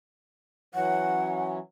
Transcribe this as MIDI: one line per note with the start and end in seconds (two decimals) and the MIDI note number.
0.75 1.59 52
0.75 1.59 54
0.75 1.59 61
0.75 1.47 78